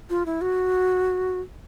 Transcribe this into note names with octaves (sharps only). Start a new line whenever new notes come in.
F4
E4
F#4